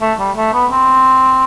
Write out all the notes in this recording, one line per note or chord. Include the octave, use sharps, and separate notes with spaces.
A3
G3
A3
B3
C4